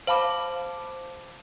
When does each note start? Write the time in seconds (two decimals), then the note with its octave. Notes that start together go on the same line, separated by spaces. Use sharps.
0.07 C5 F5 A5 B5 D6